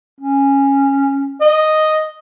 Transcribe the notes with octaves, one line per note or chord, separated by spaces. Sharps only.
C#4
D#5